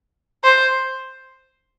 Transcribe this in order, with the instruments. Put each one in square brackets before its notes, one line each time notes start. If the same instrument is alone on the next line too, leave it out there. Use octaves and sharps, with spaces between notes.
[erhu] C5